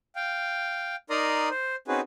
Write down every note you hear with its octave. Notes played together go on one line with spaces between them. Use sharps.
F5 G5
D#4 A#4 D5 A#5 C6 D#6
C5
C4 C#4 D#4 F#4 G#4 B4